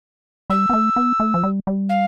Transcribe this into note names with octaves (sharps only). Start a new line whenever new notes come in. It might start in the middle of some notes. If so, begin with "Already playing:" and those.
G3 E6
B3
A3
B3
A3
F3
G3
G3
F5